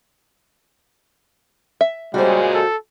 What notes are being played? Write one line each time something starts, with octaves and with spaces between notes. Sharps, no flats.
E5
A#2 C#3 G3 G#3 F#4 C5
A4